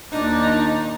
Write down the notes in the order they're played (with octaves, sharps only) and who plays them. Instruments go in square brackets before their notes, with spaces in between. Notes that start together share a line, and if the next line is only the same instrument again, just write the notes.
[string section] D#2 A#2 [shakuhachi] D4 [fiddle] D#4